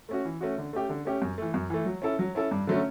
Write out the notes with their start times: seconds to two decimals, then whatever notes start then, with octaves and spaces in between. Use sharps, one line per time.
0.09 A3 C#4 F#4
0.25 E3
0.41 A3 C#4 F#4
0.58 D3
0.73 A3 C#4 G4
0.89 D3
1.05 A3 C#4 G4
1.22 F#2
1.38 E3 A3
1.54 F#2
1.70 E3 A3
1.86 F#3
2.02 C#4 E4 A4
2.19 F#3
2.35 C#4 E4 A4
2.51 G2
2.67 D3 F#3 A3 C#4